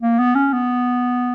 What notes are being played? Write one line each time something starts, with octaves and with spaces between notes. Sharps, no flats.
A#3
B3
C#4
B3